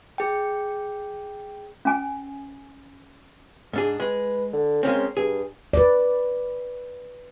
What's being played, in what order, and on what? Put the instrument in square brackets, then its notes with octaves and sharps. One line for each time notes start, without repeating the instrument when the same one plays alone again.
[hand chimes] G#4 G5
[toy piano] C#4 G#5
[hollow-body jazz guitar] G#2 D4 G#4
[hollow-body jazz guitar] G#3 [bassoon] B4
[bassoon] D3
[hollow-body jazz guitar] G#3 A#3 C4 [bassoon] C#4
[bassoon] G2 [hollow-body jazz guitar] G#4
[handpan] B4 D5